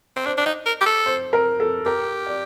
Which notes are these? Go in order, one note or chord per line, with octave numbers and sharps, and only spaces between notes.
C4
D4 C5
D4
D#4
A#4
G4
A4
C5
A#4
A4
G4 A#4
D5